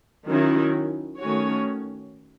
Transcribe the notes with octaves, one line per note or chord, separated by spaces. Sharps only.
D#3 F#3 C#4 E4
D#3 A3 C#4 F#4 C#5